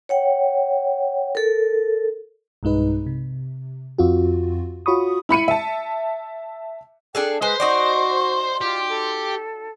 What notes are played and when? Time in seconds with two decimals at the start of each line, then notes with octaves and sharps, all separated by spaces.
0.09 C#5 F#5 G5
1.35 A4 A#4
2.63 B1 G2 G#3 D#4 B4
3.06 C3
3.98 F2 C4 F4 F#4
4.86 F4 F#4 C#5 B5 C#6 D#6
5.29 E4 B5 C#7 D#7
5.48 E5 A5
7.15 D4 G#4 A4 G5
7.42 G#3 B4 C5 C6
7.60 D#4 F#4 D5 C#6
8.61 F4 G4
8.88 A4